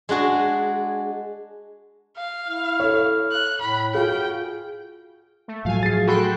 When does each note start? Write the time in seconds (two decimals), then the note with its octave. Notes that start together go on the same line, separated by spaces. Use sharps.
0.09 G#3 D4 F#4 G#4
2.17 F5
2.47 E4 F6
2.80 A4 C#5
3.32 F#6
3.62 A2 B5
3.94 F4 F#4 G#4 F5 G5
5.48 A3
5.65 A2 F3 F#3 F5 G#5
5.83 G#4 A6 C7
6.08 F#4 A4 G5 B5 C6 F#6